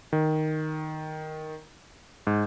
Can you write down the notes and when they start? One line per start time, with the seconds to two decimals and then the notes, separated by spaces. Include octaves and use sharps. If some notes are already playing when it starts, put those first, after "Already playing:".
0.13 D#3
2.27 G#2